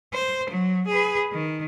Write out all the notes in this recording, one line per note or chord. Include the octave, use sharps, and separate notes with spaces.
C5
F#3
G#4 B4
D#3